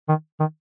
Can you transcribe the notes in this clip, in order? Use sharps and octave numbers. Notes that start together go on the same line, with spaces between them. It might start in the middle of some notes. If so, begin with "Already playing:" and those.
D#3
D#3